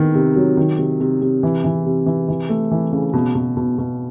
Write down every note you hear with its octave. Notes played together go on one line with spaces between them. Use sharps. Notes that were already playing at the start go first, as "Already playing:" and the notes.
Already playing: D#3 B3
C3
F#3
D#3
C3
C3
C3
E3
E3
C3
E3
E3
A3
E3
C#3
B2
B2
B2
B2